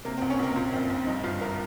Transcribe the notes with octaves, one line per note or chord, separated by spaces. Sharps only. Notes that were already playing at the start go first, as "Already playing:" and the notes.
C3 A#3
C4
C#2
C#4
C#2 A#3
A#2 C4
A#1 C4
A#1
G2 D#4
G1 F4
G1 A#4